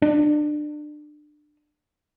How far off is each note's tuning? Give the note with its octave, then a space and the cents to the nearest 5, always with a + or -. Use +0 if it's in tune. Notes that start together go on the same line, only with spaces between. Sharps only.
D4 +25